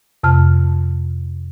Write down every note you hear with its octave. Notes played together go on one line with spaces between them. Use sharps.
F2 C3 A5 F6